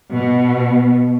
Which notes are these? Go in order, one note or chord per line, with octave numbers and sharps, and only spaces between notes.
B2